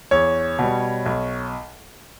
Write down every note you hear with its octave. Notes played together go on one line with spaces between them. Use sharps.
E2 C#5
B2 G3
B1